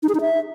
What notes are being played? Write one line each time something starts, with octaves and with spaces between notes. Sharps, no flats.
D#4
G#4
D#4
E5